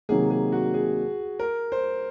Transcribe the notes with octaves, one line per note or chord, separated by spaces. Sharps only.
C3 D#3 F#3 A#3 D#4 G#4
G#4
F#4
G#4
A#4
C5